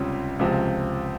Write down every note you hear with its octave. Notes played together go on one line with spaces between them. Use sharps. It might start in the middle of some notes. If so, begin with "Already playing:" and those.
Already playing: C#2 C3 G3 C#4 F4
C#2 C3 F3